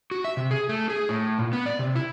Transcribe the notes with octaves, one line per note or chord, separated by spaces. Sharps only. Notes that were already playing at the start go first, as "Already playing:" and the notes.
F#4
E5
C3
G#4
A3
G#4
A2
A#2
B3
D5
C3
E4